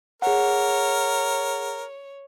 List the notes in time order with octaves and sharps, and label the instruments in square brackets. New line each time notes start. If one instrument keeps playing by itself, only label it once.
[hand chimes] G#4 F#5 [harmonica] A#4 [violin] C#5